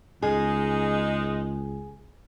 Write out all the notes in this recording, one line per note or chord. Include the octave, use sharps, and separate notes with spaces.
C#2 G#3 D#4 G#4